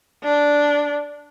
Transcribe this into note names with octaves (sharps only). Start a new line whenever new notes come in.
D4